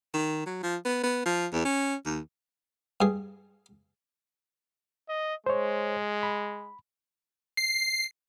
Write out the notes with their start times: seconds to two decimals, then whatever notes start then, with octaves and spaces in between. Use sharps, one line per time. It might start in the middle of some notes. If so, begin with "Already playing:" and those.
0.14 D#3
0.46 F#3
0.63 F3
0.85 B3
1.03 B3
1.26 F3
1.53 E2
1.65 C#4
2.05 D#2
3.01 G2 G#4
5.09 D#5
5.46 G#3 C5 C#5
6.23 B5
7.57 C7